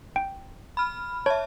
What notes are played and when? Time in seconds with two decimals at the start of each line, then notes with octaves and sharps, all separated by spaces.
0.16 G5
0.77 B5 F6
1.26 C#5 E5 A5